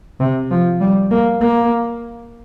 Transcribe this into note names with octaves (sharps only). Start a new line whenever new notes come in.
C3
F3
G3
A#3
A#3